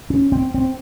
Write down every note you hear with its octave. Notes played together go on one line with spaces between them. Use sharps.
C#4
C4
C4